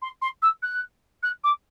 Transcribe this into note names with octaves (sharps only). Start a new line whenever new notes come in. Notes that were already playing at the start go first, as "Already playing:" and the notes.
C6
C6
E6
F#6
F#6
D6